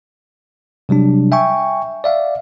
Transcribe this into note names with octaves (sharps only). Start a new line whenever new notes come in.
C3 F#3 G3 D4
E5 G5 G#5 C#6
D5 E5 F5